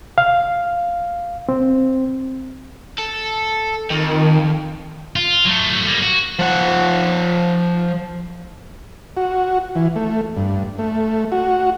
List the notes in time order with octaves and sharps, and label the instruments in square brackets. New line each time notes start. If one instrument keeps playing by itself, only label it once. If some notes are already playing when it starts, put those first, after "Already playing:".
[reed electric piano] F5
C4
[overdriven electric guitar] A4
[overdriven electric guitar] F2 [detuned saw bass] D#3
[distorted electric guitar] F4
F#3 A3
G3 A#3
F#4
[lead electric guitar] F3 F#5
[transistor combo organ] F#4
E3
A3
G2
A3
F#4